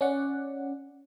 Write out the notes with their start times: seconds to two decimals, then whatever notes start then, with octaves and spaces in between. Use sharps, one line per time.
0.01 C#4 D5 F#5